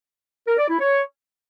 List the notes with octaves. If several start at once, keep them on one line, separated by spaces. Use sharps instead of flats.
A#4
D5
E4
C#5